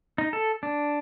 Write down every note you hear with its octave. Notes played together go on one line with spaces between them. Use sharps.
D#4
A4
D4